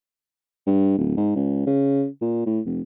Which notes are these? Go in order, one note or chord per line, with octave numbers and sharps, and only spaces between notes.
G2
D1
G#2
C#2
C#3
A#2
A2
F1